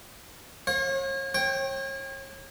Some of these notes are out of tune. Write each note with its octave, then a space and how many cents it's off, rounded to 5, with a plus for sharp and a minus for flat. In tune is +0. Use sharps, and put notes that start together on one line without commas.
C#5 -40 F5 +40
C#5 -40 G5 +0